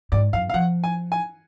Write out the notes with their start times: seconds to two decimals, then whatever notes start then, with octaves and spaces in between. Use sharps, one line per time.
0.12 G#2 D5
0.33 F#2 F5
0.50 F5
0.54 F3 F#5
0.84 G#5
1.12 G#5